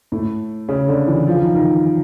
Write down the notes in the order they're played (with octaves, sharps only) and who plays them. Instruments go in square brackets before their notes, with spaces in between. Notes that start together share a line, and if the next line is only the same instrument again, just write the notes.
[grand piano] A2
C#3
D3
E3
F3
D#3
D#3